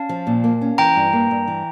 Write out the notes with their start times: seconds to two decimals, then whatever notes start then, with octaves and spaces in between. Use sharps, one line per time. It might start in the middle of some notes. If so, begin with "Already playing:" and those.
Already playing: C#4 F5 A5
0.09 F3
0.27 A#2
0.44 A#3
0.61 C#4
0.78 E3 G5 A#5
0.96 G2
1.13 A#3
1.31 G2
1.48 E3